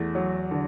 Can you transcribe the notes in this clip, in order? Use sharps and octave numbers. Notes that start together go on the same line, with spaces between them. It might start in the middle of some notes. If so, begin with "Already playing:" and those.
Already playing: E2 A3
F#3
D3